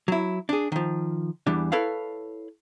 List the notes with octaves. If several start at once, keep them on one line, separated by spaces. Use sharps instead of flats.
F#3 E4
D4 G#4
D#3 F3
E2 E3 G3 D4
E4 A4 B4 C#5 F5